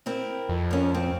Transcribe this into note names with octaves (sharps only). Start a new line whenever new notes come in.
C4 E4 A#4
F2
C#4 A#4
C4